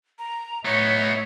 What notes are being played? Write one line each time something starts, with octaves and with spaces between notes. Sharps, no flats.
A#5
A2 B3 D#4 C#5 E5